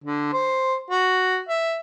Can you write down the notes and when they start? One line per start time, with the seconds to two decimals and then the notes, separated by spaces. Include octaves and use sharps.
0.04 D3
0.33 C5
0.90 F#4
1.48 E5